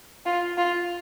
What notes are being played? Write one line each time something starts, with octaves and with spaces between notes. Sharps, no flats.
F4
F4